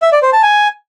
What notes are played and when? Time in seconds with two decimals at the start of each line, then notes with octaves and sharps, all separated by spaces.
0.02 E5
0.12 D5
0.22 C5
0.33 A5
0.43 G#5